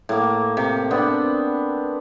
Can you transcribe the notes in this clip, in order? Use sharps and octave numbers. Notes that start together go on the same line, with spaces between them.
A2 A#3
C3
B3 C4 D4